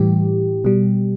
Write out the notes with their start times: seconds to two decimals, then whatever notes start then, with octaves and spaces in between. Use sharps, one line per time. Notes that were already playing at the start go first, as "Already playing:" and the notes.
Already playing: A2 E3 G3 G4
0.65 B2 G3